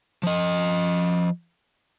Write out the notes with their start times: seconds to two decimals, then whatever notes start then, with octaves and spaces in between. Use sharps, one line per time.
0.23 F3 D#5